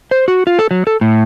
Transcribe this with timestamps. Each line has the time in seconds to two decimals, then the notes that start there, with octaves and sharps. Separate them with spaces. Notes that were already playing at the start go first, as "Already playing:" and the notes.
0.11 C5
0.28 F#4
0.47 F4
0.59 A4
0.71 F#3
0.87 A4
1.01 A2